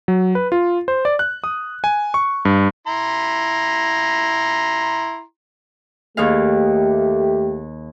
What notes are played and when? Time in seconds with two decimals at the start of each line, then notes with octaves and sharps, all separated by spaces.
0.08 F#3
0.35 B4
0.52 F4
0.88 C5
1.05 D5
1.19 F#6
1.44 D#6
1.84 G#5
2.14 C#6
2.45 G2
2.87 E4 A#5 C6
6.17 D#2 A3 G4 G#4 F5